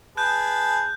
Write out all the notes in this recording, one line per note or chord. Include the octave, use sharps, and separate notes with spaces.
G#4 B4 A5 F#6 G6